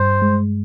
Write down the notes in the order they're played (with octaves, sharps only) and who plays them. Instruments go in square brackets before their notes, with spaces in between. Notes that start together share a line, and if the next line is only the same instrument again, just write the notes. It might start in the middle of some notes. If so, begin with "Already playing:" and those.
Already playing: [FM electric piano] G2 [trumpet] C5
[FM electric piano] G#3